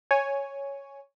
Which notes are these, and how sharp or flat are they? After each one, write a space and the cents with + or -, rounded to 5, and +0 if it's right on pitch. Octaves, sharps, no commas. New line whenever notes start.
C#5 +0 G#5 -5